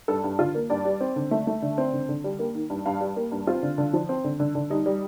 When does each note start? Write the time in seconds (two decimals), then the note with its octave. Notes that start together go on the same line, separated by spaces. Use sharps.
0.08 G2 A4
0.24 G2
0.39 D3 F4
0.55 A#3
0.70 G2 D5
0.85 G3
1.01 C4
1.16 D3
1.31 A3
1.47 A3
1.62 D3
1.78 C4
1.93 D3
2.09 D3
2.24 G3
2.39 A#3
2.55 D#3
2.70 G2
2.86 G2 F5
3.01 G3
3.16 A#3
3.32 G2
3.47 C4 F4
3.63 D3
3.78 D3
3.93 F3
4.09 C4
4.24 D3
4.40 D3
4.55 D3
4.70 G3 D#4
4.86 G3